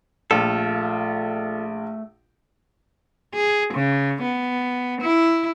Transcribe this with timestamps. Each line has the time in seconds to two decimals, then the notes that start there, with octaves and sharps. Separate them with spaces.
0.31 A#1 A3 F4 A4
3.34 G#4
3.74 C#3
4.22 B3
5.01 E4